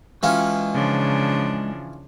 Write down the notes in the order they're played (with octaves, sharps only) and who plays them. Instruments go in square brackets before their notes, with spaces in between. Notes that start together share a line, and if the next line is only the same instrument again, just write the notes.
[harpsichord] E3 C#4 F4 [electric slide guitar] G#3 G5
[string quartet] C#3 F3 D4